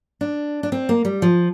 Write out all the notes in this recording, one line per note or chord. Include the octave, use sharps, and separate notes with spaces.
D4
D4
C4
A#3
G3
F3